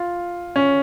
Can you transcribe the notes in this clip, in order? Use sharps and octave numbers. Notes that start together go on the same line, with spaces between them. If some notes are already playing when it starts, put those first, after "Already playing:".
Already playing: F4
C#4